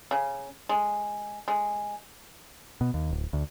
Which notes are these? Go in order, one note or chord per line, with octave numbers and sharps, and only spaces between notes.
C#3
G#3
G#3
B2
D#2
D1
D2